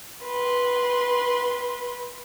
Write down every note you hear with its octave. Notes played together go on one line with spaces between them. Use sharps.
B4 C6